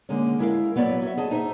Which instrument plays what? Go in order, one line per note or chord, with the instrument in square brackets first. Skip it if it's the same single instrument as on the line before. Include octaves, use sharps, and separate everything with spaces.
[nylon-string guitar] D3 G#3 A#3 C#4
G#3 E4 A#4 F5
F#3 B3 C#5 D5
F#4 E5
G#4 D#5 A5
D#4 C5 E5